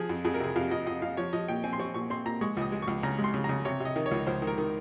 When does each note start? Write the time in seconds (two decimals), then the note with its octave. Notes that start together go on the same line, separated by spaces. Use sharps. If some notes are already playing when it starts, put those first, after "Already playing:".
Already playing: F3 G#4
0.09 F2
0.25 F2 G#4
0.34 A#4
0.40 C3 G#4
0.56 F2 F5
0.71 F2 D#5
0.87 F2 D#5
1.02 F2 F5
1.17 F3 C#5
1.33 F3 D#5
1.48 A#2 G5
1.64 C4 G#5
1.73 C6
1.80 C4 C#6
1.94 A#2 C#6
2.10 C4 C6
2.26 A#2 A#5
2.41 G#3 C#6
2.57 C#2 D#6
2.72 G#3
2.82 C#6
2.87 C#2
3.03 C#3 A#5
3.18 G#3
3.24 C6
3.34 C#3
3.44 C#3 A#5
3.65 C3 C#5
3.80 C3
3.85 D#5
3.96 D#3
4.06 C#5
4.11 C#2
4.27 C#2 C5
4.42 D#3
4.47 A#4
4.58 D#3